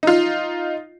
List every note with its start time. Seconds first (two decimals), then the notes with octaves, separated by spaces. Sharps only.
0.03 D#4 F4